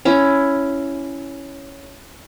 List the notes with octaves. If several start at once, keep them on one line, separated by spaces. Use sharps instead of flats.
C#4 E4